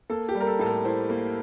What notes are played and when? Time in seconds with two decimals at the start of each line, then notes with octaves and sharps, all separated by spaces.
0.10 A#3 A4
0.29 G4
0.35 G3
0.40 A#4
0.47 A4
0.59 A2 A4
0.66 A#4
0.85 E4 C5
1.10 A#3